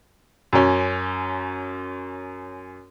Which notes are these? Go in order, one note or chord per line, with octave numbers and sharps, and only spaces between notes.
F#2 C#4